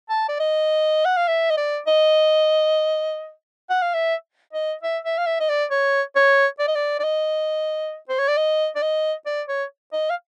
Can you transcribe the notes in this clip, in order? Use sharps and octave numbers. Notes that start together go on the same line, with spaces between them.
A5
D5
D#5
F#5
F5
E5
D#5
D5
D#5
F#5
F5
E5
D#5
E5
E5
F5
E5
D#5
D5
C#5
C#5
D5
D#5
D5
D5
D#5
C5
C#5
D5
D#5
D5
D#5
D5
C#5
D#5
F5